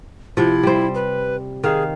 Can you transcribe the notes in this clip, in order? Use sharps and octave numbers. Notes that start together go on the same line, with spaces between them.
C3 F3 E4
G3 C5
B4
D#3 G#4 F5